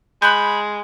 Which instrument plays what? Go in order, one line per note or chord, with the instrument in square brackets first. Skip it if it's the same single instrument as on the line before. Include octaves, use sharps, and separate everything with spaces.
[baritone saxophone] G#3 [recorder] B5 [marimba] F#6 G6